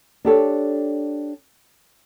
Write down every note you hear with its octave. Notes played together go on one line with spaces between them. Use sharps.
D4 G4 A4 C#5